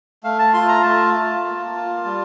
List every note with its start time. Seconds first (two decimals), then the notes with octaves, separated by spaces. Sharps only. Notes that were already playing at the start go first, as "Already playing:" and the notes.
0.24 A3 F5
0.39 A5
0.54 F4 C6
0.68 A#5
0.83 A3 A5
1.14 F4
1.44 A#3
1.75 F4
2.05 G3